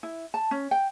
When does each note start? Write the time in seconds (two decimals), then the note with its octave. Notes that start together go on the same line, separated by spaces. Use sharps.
0.03 E4
0.34 A5
0.51 C#4
0.71 G5